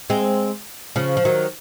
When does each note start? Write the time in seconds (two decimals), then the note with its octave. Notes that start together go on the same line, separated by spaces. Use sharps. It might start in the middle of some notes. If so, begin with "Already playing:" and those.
0.10 G#3 C4
0.96 C#3 F3
1.17 F3
1.25 D#3 F#3